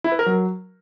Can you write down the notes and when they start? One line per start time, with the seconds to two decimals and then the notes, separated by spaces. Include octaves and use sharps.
0.04 E4
0.12 B4
0.19 A#4
0.26 F#3